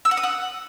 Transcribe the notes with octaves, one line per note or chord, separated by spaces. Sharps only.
E6
F#5
D#6
F#5